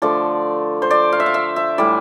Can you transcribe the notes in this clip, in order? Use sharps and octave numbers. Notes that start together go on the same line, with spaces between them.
D3 F3 A3 D5
C5
D5
F5
E5
F5
E5
E5
A2 E3 G3 D5